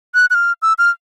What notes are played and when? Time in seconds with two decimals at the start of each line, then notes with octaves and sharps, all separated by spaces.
0.15 F#6
0.30 F#6
0.34 F6
0.62 E6
0.79 F6